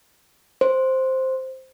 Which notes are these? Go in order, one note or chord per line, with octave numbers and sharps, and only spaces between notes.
C5